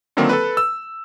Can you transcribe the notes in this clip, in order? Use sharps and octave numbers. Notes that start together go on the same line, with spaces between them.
D3 D#3 F#3 A#3 C4
A4 B4
E6